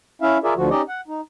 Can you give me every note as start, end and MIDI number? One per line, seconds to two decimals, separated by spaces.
0.22 0.38 61
0.22 0.38 64
0.22 0.38 76
0.22 0.38 77
0.44 0.54 65
0.44 0.54 68
0.44 0.54 70
0.44 0.54 74
0.44 0.54 76
0.56 0.69 38
0.56 0.69 50
0.56 0.69 53
0.56 0.69 66
0.70 0.82 61
0.70 0.82 63
0.70 0.82 67
0.70 0.82 74
0.70 0.82 75
0.89 1.01 78
1.08 1.21 63